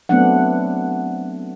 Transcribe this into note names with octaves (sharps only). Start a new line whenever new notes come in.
F#3 A3 B3 C4 D4 F#5